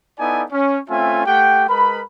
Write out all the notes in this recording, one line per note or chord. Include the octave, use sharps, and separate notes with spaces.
B3 D#4 E4 A4 D5 G#5
C#4
A3 C4 C#4 F4 E5 G#5
A3 G4 F#5 G5
G#3 A#4 B4 B5